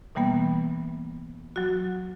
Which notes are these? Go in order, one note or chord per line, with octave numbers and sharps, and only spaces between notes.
B2 E3 G3 A#3 B3
F#3 F#4